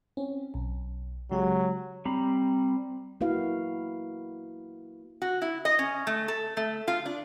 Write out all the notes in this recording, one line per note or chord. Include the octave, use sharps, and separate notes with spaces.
C4 C#4
B1
C#3 F#3 G#3 G4
G3 C4 A#5 B5
A#3 E4 F#4 B4 F5
F#4
E4
D#5
C#4
A3
A4
A3
F4
D4